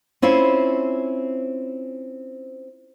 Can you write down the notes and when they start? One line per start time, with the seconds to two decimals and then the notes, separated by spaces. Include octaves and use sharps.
0.22 C4 C#4 E4 F4